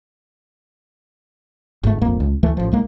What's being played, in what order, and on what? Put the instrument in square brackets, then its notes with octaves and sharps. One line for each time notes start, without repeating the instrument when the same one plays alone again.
[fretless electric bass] G1 G#2 C3 A3
D1 G1 F2 A#3
C#2
D2 E3 A3
A1 F3
B1 G#3 A#3